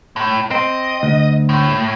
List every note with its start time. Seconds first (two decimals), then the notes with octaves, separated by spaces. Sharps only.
0.16 A2
0.51 C4 D#5
1.03 D2
1.49 A2